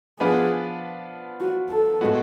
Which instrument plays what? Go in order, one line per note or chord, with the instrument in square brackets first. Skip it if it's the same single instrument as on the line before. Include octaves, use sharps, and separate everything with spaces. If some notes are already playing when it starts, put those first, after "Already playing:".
[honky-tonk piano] F3 B3 D4 F4 B4 [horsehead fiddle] G#4
[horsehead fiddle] F#4
A4
[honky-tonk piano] A2 G#3 B3 F#4